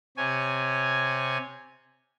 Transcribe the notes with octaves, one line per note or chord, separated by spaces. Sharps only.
C3 C#5 G#5